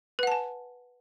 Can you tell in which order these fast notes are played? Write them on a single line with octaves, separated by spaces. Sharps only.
B4 F#5 A5 G#5